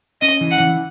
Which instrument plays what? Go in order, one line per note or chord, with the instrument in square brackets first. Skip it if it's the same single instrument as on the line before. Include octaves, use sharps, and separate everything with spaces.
[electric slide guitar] C#4 [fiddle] D#5
[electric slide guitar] E3
[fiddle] F#5
[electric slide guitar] E3